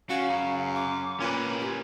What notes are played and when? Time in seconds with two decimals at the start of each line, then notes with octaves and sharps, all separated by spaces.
0.09 C#3 F#4 F5
0.29 F#2
0.74 D6
1.20 A#2 C#4 B4
1.61 G4